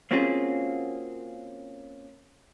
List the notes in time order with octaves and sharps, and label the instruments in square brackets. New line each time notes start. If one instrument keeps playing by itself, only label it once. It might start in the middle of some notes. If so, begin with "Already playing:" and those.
[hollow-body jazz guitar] A#3 C4 C#4 F4 F#4 G#4